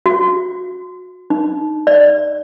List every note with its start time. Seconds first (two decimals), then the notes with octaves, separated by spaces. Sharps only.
0.06 F#4
1.30 D#4
1.87 D5